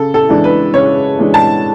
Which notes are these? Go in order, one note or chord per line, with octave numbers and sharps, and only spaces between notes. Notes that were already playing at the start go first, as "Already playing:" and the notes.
Already playing: C#3 A4
A4
E3 G#3 D4
B4
C#3 C#5
E3 G#3 D4
A5